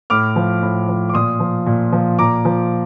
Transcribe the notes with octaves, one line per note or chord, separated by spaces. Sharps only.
A2 D6 F6
F3
A2
F3
D6
A#2 C6 D#6
F3
A#2
F3
A#2 A#5 D6
F3